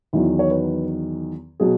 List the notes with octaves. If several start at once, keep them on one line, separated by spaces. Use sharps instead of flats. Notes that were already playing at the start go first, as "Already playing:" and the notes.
E2 D#3 F#3 E4
C#5
B4
B2 F#3 G#4